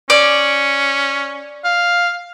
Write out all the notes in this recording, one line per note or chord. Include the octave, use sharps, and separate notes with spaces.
C#4 D5
F5